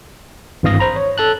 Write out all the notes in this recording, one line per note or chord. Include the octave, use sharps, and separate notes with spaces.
G#1 G2 E3 F5 D#6 A#6
C5 A#5 B5
C#5
A4 A5 F#6